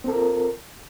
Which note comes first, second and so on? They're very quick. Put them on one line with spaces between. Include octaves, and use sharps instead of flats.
C4 A4 A#4 F4